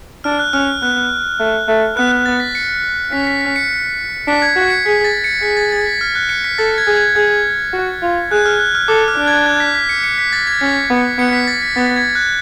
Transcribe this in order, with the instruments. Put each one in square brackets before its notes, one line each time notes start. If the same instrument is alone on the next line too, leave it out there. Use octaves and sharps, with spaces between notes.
[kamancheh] D4 [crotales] F6
[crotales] F#6
[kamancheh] C#4 [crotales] F6
[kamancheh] B3 [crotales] F#6
[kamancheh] A3
A3
[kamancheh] B3 [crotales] F#6
[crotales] F#6
A6
B6
C#7
[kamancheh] C#4 [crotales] B6
[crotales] B6
B6
C#7
[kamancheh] D4 [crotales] B6
[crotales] G#6
[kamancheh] F#4 [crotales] B6
[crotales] C#7
[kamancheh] G#4 [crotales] B6
[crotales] A6
C#7
[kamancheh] G#4 [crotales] B6
[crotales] A6
A6
B6
F6
F#6
C#7
B6
[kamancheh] A4 [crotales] A6
[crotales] G#6
[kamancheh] G#4
[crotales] G#6
[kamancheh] G#4 [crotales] G#6
[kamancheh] F#4
F4
[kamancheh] G#4 [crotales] F#6
[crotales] F6
F#6
F6
[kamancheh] A4 [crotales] D6
[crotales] F6
[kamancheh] D4
[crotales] G#6
F#6
B6
B6
C#7
C#7
B6
A6
G#6
[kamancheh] C#4 [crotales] B6
[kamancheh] B3
[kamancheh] B3 [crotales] C#7
[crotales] B6
A6
B6
[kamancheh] B3 [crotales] A6
[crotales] G#6
F#6